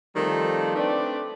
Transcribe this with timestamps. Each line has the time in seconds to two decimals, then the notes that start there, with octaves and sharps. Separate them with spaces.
0.15 D#3 F3 G3 A3 C4
0.76 A3 C4 D4 B4 D5